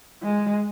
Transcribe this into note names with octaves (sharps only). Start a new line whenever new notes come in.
G#3